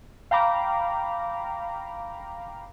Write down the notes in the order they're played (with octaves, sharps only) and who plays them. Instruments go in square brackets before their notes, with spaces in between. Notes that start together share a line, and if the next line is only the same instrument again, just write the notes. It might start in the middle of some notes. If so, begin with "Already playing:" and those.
[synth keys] F5 G5 A#5 B5 D6